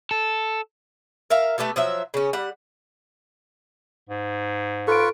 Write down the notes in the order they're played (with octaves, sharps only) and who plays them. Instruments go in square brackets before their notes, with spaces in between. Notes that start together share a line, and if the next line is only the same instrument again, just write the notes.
[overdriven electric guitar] A4
[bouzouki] A#4 E5 F5
A3 B3 G4 A4
F3 F#3 E5
C#3 C#4
G3 F#5
[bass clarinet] G#2
[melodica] F4 B4 C#6 [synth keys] A4 D7